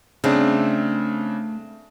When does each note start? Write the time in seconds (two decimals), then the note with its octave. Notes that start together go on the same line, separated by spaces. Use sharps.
0.24 C#3 A3 C4 D4 G#4